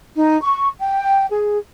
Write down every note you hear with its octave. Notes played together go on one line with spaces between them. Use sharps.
D#4
C#6
G5
G#4